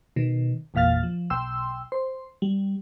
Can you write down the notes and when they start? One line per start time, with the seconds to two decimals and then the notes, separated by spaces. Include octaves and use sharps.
0.16 B2 D#3
0.74 G#1 E2 A#2 F5 F6 A6
1.03 F3
1.30 B1 G5 C6 E6
1.92 C5 C6
2.42 G3